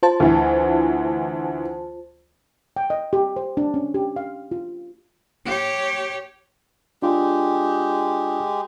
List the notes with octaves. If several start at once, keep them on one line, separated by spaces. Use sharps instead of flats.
F4 C5 A5
D2 E3
G5
D#5
G4
C5
D4
C#4
G4
F5
F4
G4 C#5
G#3 D4 F4 G4